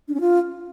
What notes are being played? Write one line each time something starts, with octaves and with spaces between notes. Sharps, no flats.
D4
C#4
F4